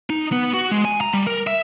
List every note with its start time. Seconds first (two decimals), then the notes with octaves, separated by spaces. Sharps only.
0.10 D#4
0.32 B3
0.54 F#4
0.71 G#3
0.85 G#5
1.01 A#5
1.14 G3
1.27 A#4
1.47 E5